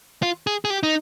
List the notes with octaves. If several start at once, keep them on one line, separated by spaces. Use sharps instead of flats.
F4
G#4
G#4
G4
D#4